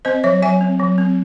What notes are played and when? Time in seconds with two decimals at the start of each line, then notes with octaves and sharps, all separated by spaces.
0.05 C4 C5 D#5
0.24 F#3 C#5 E5
0.42 F#3 E5 G#5
0.61 C4
0.79 F#3
0.98 C4